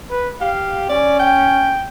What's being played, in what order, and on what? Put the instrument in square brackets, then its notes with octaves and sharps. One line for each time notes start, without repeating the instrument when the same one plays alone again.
[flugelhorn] B4
[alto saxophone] G4 [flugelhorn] F5
[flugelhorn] C#4 [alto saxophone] D5
[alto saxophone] G5